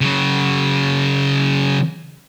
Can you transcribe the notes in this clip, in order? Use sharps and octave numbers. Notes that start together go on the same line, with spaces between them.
C#3 F#3